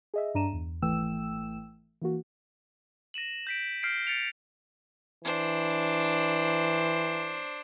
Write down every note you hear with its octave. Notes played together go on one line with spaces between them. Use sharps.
G#4 D#5 E5
G2 D4 A#5 D#7 E7
E2
G#1 E3 A3 G5 E6 E7
E3 A#3 F#4
A#6 D#7 E7 F#7
G6 B6 D7
F6 G6 C7 D7
A6 C#7 D7 F7
E3 D4 C5